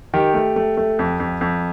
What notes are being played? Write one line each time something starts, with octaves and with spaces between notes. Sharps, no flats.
D#3 G4
A3
A3
A3
F2
F2
F2